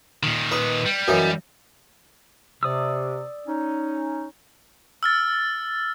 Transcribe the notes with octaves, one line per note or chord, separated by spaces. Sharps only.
A#2 D#3
D#4 B4
G3
F#2 E3 D#4
C3 D5 D#6 E6
C#4 D#4
E6 F6 A6